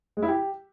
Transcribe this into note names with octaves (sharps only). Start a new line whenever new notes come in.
G#3
E4
G4